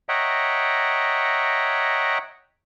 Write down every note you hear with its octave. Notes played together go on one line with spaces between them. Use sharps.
C#5 D#5 E5 F#5 G5 A#5